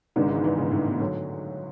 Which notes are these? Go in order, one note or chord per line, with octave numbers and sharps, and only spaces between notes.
G#1 G#2 C#3 G#3 B3 D4
E3
E3
C#3
A2
B2
D3 F#3